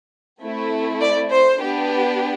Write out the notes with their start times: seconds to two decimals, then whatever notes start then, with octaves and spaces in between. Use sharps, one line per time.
0.42 A3 C4 E4
1.01 D5
1.30 C5
1.60 B3 D4 G4